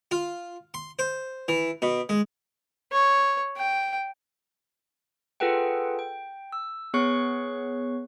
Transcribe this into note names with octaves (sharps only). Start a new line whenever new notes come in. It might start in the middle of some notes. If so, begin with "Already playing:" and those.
F4
C6
C5
E3
B2
G#3
C#5
G5
F4 G#4 A4 B4 F#5 G5
G5
E6
B3 G#4 C#5 C#6 F#6 C7